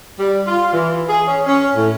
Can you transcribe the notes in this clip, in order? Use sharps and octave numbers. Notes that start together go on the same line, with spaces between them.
G3
F4
E3
G#4
C#4
C#4
A2